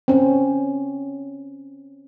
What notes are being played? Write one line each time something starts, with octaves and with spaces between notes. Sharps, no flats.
C4 C#4